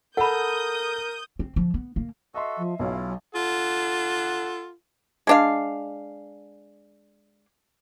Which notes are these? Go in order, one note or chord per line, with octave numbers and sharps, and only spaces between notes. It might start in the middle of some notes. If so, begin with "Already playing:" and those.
A4 A#4 F#5 B5 D#6 G6
C4
F3
B3
A#3
F#4 A4 D#5 E5 C6
F3
B1 F#3 C#4 E4 F4
F4 A4 F#5
G#3 D4 F5